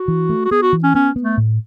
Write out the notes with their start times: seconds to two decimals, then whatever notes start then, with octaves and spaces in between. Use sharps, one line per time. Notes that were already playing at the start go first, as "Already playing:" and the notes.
Already playing: F#4
0.08 E3
0.29 A3
0.45 F#4
0.51 B3 G#4
0.62 F#4
0.73 E3
0.84 C#4
0.94 B3 C#4
1.16 B3
1.22 A3
1.37 A2